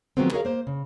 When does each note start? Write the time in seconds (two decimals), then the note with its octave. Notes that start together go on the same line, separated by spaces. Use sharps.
0.17 D#3 F3 F#3 G#3 B3 C4
0.32 F#4 G#4 A#4 C#5 E5 F5
0.45 A#3 C5
0.67 C#3